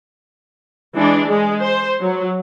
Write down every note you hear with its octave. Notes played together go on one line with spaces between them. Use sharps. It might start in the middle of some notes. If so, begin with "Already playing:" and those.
E3 G#3 D4
G#3
C5
F#3